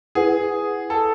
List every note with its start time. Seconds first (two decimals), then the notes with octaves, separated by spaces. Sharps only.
0.15 E4 G#4 B4 F#5
0.90 A4